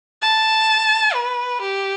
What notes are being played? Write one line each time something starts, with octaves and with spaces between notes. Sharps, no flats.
A5
B4
G4